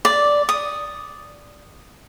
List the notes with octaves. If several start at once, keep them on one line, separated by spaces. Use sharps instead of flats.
D5
D#6